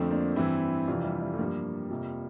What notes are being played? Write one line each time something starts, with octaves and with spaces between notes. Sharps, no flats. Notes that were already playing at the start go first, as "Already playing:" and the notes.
Already playing: F2 D3 F3 A3 C4
A#3 D4
G2 E3 C4 E4
F2 C3 E3 D4 F4
G3
G3
A3
G2 F3 G3 A#3
F2 C3 F3